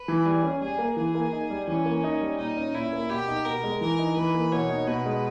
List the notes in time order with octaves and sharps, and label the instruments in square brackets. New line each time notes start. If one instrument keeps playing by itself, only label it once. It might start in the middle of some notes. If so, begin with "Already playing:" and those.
Already playing: [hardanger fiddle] B4
[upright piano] E3
[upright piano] G3 [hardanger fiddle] G#4
[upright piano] C#4
[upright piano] G3 [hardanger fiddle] G#4
[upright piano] A#3
[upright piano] E3 [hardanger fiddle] G#4
[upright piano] A#3
D#4
G3
[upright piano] E3 [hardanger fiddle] C#4
[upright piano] A#3
D#4
G3
[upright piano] A#2 [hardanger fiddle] D#4
[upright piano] C#4
[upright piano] A#2 [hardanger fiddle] E4
[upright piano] A#3
[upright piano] B2 [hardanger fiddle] G4
[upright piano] D#4
[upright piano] B2 [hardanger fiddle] A#4
[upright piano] G#3
[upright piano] E3 [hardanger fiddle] A#4
[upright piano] D#4
[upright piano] E3 [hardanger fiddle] B4
[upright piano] A#3
[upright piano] B2 [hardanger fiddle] C#5
[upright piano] D#4
[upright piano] B2 [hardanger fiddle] B4
[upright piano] G#3